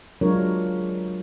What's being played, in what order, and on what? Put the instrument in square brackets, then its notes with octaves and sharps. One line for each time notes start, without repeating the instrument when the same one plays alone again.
[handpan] F#3 G#3 D4 F4 A#4 C#5